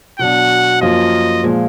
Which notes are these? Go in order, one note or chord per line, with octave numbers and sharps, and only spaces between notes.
B2 F#3 D4 F#5
F#2 F3 A#3 F4 D#5
A#2 F3 G#3